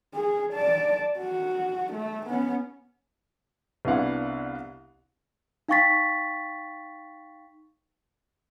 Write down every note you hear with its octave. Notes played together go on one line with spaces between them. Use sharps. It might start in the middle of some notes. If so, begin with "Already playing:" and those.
G#4
D5 A5
F#4
A3
B3 C#4
C2 B3 D4 E4 F5 F#5
D#4 F5 G5 C#6 A6 B6